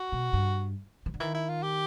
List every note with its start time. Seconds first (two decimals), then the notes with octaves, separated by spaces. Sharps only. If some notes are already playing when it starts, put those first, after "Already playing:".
Already playing: F#4
0.12 B2
0.33 G2
1.06 E3
1.14 D3
1.20 D#3 E4
1.34 E4
1.49 F4
1.63 G4